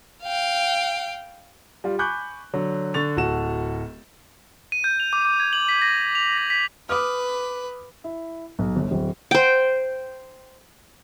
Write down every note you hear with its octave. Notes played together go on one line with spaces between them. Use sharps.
F5 G5
G3 F4
G#5 B5 C#6 D6 F#6 G6
D3 F#3
D3 C#6 A6 F7
D1 F#4 A4 E7
D#7
G6
F7
D6
D6
G#6
F#7
B6
A#6
F7
A#6
B6
B4 D6 D#6 F6
E4
B1
G1
D1
C5 G5